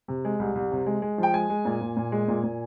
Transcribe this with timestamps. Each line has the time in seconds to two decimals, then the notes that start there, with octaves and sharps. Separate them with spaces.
0.08 C3
0.25 G#3
0.39 C2
0.55 C2
0.71 C3
0.86 G#3
1.02 G#3
1.18 F3 G5
1.34 G#3 G#5
1.50 G#3
1.65 A#2
1.81 A#2
1.97 A#2
2.12 G#3
2.28 A#2
2.43 A#2